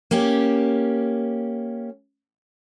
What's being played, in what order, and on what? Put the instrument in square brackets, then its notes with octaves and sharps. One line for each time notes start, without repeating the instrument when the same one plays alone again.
[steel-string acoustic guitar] A#3 C#4 G4